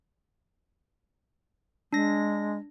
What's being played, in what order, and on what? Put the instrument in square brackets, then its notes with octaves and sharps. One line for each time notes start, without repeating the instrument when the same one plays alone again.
[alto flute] G#3 [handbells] D4 A#6